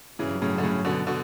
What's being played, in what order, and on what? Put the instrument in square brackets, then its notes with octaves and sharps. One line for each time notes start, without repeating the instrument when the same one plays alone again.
[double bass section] G2 F#3 C#4 [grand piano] C#3 E3
[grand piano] A2 C#3
D3
A2 C#3
B2 D3
B2 D3